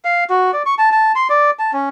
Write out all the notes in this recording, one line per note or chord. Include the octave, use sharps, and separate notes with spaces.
F5
F#4
D5
C#6
A5
A5
C6
D5
A5
C#4